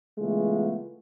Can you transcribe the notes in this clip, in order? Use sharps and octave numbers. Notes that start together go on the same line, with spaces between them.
C#3 E3 G#3 A3 B3 F4